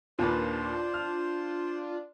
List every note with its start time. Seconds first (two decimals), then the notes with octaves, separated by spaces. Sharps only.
0.19 D#2 A#2 D4 F4 B4 C5
0.94 F6